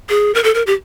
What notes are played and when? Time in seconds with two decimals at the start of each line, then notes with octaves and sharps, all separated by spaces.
0.09 G#4
0.35 A#4
0.44 A4
0.55 A#4
0.67 G4